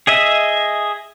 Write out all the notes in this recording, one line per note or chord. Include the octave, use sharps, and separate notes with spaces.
G#4 D#5 E5